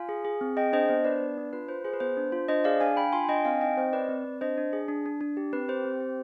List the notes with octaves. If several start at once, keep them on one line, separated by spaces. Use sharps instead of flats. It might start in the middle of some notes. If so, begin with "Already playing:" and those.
Already playing: F4 F5 G#5
G#4
G#4
C4
G#4 D#5 G5
D4 C5 D#5
B3 C5
D4 B4 D5
B3
D4
F4 B4
F4 C5
G#4 C5
B4
B3 C5
D4
F4
D4 C5 D#5
G#4 D5 F5
D4 F5 G#5
D4 G5 B5
F4 G#5 C6
D4 D#5 G5
C4 F5 G#5
D#4 D#5 G5
C4 C5 D#5
C4 B4 D5
C4
C4
D4 C5 D#5
D4
G#4
D4
D4
D4
G4
C4 B4
G4 C5
C4
G4